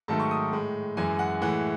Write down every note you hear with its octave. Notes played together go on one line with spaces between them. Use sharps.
G#2 D#3 F#3 A3 A5
C#6
D#6
A2 G#3
F#2 E3 G#3 G#5
F#5
A2 E3 G#3 F#5